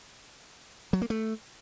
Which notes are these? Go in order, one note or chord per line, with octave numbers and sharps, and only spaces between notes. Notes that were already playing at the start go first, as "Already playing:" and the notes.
F#3
A#3
A3